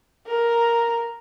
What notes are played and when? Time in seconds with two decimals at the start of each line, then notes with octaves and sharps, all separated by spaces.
0.27 A#4